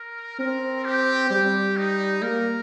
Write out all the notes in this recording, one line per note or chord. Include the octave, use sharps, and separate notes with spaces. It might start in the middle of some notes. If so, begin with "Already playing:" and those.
Already playing: A#4
C4 A#4
G4
G3 G4
D#4
A#3 A#4